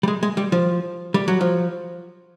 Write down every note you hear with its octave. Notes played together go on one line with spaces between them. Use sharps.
G3
G#3
G#3
G3
F3
G3
F#3
F3